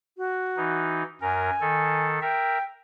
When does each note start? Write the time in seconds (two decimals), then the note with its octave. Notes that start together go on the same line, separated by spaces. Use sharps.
0.17 F#4
0.57 E3 D#4
1.21 F#2 A#4 G#5
1.60 D#3 A4
2.21 A#4 E5 G5